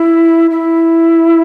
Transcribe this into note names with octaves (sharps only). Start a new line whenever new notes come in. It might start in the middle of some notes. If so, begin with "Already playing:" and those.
Already playing: E4
E4